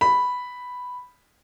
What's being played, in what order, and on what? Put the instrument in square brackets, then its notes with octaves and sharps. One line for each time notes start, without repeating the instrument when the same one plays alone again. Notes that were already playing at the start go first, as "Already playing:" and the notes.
[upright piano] B5